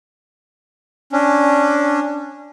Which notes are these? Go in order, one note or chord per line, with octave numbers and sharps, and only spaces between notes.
C#4 D4